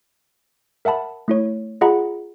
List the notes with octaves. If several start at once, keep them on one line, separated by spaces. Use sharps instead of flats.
A#4 E5 F#5 A5 B5
A3 E4 C#5
F4 G#4 D#5 F#5 A#5 B5